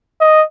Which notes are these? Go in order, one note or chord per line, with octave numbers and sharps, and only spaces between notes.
D#5